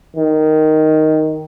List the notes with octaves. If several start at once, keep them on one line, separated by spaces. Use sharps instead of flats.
D#3